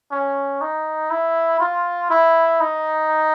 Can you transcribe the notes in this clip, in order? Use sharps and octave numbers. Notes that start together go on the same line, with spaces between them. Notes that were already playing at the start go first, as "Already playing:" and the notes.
C#4
D#4
E4
F4
E4
D#4